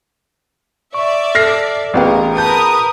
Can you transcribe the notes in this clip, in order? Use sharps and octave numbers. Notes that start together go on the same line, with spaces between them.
D5 E5 C#6
A4 F6 A#6 C7
A1 B3 F4 G#4 A#4 F5 G5
A#4 B4 A5 D#6 G6